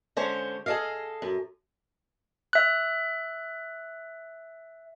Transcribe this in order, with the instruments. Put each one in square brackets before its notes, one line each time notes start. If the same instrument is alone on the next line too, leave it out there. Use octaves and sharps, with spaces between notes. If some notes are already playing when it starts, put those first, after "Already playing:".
[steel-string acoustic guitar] D3 G#3 C#4 C5 C#5
G#4 A4 D5 D#5 F5
F#2
[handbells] E5 F#6